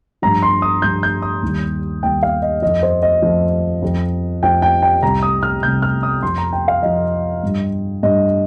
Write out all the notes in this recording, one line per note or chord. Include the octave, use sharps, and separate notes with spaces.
G2 F3 A#5
C6
D#6
G2 F3 G6
G6
D#6
D#2 D#3 G3
D#2 D#3 G3 G5
F5
D#5
F2 F3 D#5
C5
D#5
F2 F3
F2 F3
F2 F3 G5
G5
G5
C2 C3 G3 A#5
D#6
F6
C2 C3 G3 G6
F6
D#6
F2 F3 C6
A#5
G5
F5
F2 F3 D#5
G2 G3
G2 G3 D#5